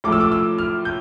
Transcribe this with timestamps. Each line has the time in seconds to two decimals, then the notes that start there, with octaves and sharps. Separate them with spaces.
0.04 A2 F3 A3 D6
0.12 E6
0.20 D6
0.32 E6
0.58 F6
0.85 G6